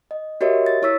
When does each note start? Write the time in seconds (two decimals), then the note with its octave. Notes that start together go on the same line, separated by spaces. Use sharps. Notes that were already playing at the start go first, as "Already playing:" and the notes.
0.11 D#5
0.41 F#4 G4 A#4 C#5 D#5 E5
0.66 A6
0.82 E4 C#5 C#6 E6 B6